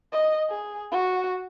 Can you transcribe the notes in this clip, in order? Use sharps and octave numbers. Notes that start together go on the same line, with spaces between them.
D#5
G#4
F#4